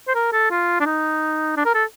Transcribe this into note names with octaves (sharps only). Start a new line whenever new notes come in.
C5
A#4
A4
F4
D4
D#4
D4
A#4
A4